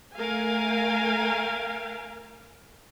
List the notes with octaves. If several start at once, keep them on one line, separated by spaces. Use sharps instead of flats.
A3 A#4 F5 G#5